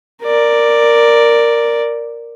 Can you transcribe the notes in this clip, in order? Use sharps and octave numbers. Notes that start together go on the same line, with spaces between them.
A#4 D5